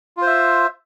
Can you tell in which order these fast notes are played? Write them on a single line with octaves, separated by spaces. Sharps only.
F4 C5 E5